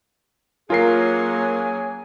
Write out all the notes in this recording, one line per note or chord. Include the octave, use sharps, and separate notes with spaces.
F#3 A#3 C#4 F4 G#4 A#4 G#5 C7